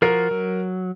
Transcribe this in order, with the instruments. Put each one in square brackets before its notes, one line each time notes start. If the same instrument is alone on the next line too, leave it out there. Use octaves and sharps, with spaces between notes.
[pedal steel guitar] F3 F4 F#4 [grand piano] A#4
[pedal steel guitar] F#3